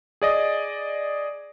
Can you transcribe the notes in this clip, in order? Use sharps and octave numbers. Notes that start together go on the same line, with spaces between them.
G#4 D5 D#5